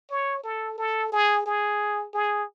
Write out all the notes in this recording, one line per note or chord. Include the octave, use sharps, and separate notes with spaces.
C#5
A4
A4
G#4
G#4
G#4